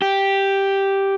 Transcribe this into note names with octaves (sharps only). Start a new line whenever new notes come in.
G4